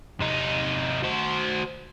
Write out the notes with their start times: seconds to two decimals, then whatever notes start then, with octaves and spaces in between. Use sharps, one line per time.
0.20 C3 D#4
1.03 F#4 C5